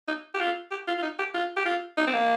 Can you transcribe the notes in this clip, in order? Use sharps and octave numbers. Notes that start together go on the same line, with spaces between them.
D#4
G4
F4
G4
F4
F4
D#4
G4
F4
G4
F4
D#4
C4
A#3